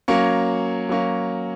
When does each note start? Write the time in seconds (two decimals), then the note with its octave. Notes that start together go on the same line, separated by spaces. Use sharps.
0.08 F#3 A#3 C#4
0.89 F#3 A#3 C#4